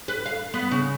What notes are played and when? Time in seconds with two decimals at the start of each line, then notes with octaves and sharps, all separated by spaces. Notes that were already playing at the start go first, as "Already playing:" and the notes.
0.08 B4
0.26 F5
0.54 B3
0.71 C#3